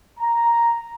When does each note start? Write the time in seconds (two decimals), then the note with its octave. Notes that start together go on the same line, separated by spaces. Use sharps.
0.18 A#5